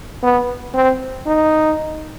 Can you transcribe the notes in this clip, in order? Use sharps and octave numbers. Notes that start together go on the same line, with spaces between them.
B3
C4
D#4